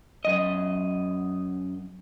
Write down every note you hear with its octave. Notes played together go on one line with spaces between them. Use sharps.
F#2 D#5